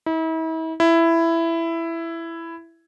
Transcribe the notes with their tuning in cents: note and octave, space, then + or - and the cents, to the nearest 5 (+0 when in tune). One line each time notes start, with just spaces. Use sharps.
E4 -40
E4 +10